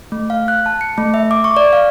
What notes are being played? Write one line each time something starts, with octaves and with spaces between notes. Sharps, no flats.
A3
F5
F#6
A5
C#7
A3
E5
D6
C#6
D5
F5